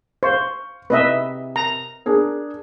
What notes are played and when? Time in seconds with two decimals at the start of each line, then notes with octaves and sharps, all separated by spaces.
0.23 C5 F5 C#6
0.90 C3 B4 D#5 E5
1.56 A#5
2.06 D4 G#4 A#4